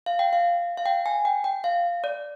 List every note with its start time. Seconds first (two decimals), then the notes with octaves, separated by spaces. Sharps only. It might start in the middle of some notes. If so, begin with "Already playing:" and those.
0.06 F5
0.19 G5
0.33 F5
0.78 F5
0.86 G5
1.06 G#5
1.25 G5
1.44 G5
1.64 F5
2.04 D5